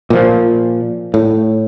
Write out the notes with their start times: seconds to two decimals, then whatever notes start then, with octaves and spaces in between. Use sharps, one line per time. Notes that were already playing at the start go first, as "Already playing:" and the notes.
0.10 A#2 F3
1.14 A2